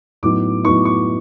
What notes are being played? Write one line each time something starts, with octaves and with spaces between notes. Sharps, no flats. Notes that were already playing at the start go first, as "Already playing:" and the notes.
A2 F#3 B3 D#4 D6
A2 F#3 B3 D#4 C#6
C#6